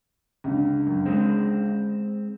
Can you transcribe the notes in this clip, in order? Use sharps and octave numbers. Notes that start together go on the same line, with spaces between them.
C#2 D3
F#2
G#3 C4